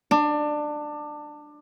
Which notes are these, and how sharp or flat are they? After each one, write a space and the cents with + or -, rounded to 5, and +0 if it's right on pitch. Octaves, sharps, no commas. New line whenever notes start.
D4 +20